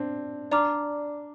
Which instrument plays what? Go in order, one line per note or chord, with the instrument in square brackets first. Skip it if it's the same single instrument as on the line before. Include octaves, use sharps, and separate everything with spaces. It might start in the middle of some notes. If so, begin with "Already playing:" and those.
Already playing: [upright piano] C4 D4
[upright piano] D4 [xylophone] D5 A#5 D6 F6